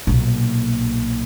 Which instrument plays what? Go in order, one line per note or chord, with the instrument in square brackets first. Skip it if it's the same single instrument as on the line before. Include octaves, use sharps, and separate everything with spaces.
[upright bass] B1 A#2